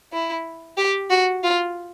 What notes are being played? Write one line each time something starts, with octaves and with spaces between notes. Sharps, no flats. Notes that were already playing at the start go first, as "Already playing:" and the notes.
E4
G4
F#4
F4